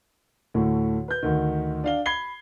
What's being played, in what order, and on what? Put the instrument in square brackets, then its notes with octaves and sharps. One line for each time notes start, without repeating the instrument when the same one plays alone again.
[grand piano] D2 A2 A3
B4 G6
D2 D#3
D4 F5 G7
B5 G#6 C7 G7